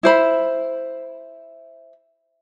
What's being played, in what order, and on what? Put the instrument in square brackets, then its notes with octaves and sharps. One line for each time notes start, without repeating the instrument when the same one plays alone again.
[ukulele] E4 C5 B5